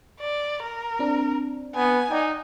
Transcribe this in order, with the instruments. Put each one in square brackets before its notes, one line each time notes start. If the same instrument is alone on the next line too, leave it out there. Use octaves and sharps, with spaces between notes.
[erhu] D5
A#4
[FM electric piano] C4 D4
[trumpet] B3 [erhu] G#5
[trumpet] D#4 [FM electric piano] D5 F#5 G5